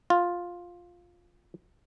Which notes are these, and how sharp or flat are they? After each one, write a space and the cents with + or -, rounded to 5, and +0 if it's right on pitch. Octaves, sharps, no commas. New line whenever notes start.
F4 +5